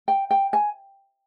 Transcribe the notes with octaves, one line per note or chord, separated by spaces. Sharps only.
G5
G5
G#5